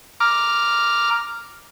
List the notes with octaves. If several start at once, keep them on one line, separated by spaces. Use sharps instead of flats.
A#5 D6 F6